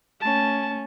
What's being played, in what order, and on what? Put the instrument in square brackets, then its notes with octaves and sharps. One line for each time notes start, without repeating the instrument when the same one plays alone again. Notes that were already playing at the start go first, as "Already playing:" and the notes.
[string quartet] A3 C#4 [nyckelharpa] A5